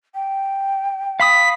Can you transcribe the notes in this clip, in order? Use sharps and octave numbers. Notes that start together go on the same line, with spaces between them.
G5
F5 B5 D#6 B6